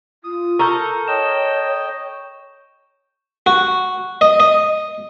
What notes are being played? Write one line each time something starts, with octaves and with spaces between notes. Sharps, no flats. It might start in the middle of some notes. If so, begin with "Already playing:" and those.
F4 D#6
A4 A#4 C#6 G6
C#5 D#5 G5 E7
F#4
D#5
D#5